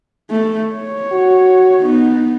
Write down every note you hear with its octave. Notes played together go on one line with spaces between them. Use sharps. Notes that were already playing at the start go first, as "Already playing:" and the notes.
A3
C#5
F#4
B3 D#4